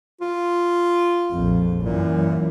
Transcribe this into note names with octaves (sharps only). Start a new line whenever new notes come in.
F4
A#1 F2
F#2 A#2 E3